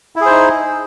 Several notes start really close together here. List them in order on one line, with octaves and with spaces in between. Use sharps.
E4 G#4 C5 D#4